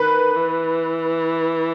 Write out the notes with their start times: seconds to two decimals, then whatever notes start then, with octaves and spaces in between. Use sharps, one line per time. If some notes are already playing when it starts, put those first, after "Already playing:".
Already playing: D#3 B4
0.36 E3